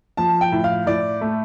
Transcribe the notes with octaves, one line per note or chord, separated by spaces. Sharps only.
F3 A5
G5
A2
F5
A2 D5
A3